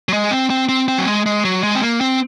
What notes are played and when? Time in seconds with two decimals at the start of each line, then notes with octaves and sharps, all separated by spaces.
0.09 F#3
0.13 G#3
0.31 C4
0.50 C4
0.69 C4
0.88 C4
0.98 F#3
1.07 G#3
1.26 G#3
1.45 F#3
1.63 G#3
1.75 C4
1.83 A#3
2.01 C4